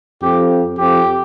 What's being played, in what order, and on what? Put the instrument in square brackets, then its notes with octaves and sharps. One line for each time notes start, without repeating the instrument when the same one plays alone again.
[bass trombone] F2 [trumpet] G4
[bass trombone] F2 [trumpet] G4